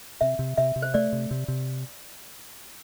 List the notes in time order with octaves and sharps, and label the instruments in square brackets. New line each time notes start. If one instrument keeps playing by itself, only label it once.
[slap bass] C3 [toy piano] E5
[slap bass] C3
[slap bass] C3 [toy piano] E5
[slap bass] C3
[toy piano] C5
[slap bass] A3 [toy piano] D5
[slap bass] C3
C3
C3